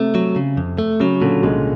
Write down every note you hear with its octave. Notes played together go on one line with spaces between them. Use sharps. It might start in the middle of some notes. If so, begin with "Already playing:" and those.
Already playing: C3 A3
F#3
C#3
F2
A3
C#3 F#3
A#2 D3
C2 G#3